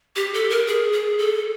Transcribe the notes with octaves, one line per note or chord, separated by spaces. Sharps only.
G4
A4
A#4
G#4
G#4
A4